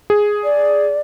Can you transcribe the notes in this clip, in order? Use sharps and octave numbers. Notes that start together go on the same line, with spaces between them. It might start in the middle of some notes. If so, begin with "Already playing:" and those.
G#4
D5